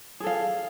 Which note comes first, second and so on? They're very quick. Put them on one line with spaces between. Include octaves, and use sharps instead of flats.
G#4 A4 F5